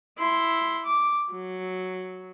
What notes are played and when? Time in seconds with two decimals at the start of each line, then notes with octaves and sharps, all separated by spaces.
0.18 E4 C6
0.86 D6
1.31 F#3